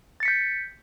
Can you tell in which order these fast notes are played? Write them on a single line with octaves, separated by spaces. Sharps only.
A6 C#7 B6 G6